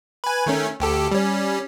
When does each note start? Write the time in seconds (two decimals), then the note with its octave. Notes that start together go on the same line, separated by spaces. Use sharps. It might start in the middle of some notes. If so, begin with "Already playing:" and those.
0.24 B4 G#5
0.46 D#3 A3 C#4
0.80 D2 G4 A4
1.12 G3 C#4